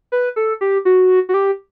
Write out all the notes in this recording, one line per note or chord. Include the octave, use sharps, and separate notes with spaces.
B4
A4
G4
F#4
F#4
G4